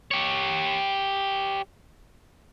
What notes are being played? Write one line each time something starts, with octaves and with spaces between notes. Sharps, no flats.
G4 C#5